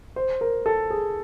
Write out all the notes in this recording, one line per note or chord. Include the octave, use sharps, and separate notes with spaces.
C5
A#4
A4
G#4